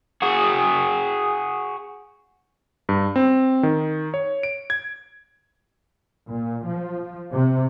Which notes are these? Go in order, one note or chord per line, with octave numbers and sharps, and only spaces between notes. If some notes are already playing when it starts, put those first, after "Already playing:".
F#4 G#4
G2
C4
D#3
C#5
D7
G#6
A#2
F3
C3